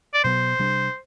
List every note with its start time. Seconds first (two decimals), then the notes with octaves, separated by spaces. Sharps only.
0.14 D5
0.24 B2 F#3 B3 C5
0.59 C3 G3 D4